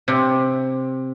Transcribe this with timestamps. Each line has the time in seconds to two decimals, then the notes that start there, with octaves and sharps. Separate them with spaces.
0.08 C3